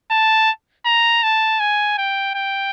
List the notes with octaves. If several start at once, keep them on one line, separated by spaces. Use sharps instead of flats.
A5
A#5
A5
G#5
G5
G5